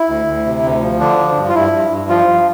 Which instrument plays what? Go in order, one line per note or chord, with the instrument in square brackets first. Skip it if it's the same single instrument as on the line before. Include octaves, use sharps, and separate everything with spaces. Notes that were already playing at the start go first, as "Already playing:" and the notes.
Already playing: [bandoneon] E4
D2
D2
C3
D2
F3
D3 D4
F3
G2
F4
G2 E4
G2
G2
F3 F4
F3